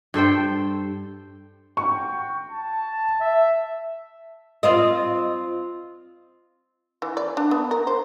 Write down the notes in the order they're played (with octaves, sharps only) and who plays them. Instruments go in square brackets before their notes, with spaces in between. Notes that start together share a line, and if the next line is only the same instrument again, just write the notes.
[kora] G2 A4 C5 G5
[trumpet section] F#4 G5 [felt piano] C#6
[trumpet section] A5
[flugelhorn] E5
[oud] C4 F4 D#5
[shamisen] E3
D5
D4
B3
A#4
C5